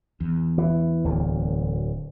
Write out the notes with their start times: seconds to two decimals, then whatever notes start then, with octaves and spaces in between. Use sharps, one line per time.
0.20 E2
0.58 E3
1.04 D1 D2